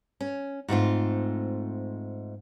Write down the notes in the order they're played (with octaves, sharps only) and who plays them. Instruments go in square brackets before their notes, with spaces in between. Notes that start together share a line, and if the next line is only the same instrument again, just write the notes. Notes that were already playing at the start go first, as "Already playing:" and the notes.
[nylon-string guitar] C#4
G#2 A3 C4 F4